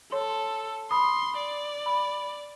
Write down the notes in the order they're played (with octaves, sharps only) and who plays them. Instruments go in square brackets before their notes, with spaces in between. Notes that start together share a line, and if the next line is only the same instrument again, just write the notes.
[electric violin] A4 [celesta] C#5 C6
[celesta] B5 D#6 [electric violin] C6
[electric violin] D5
[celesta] B5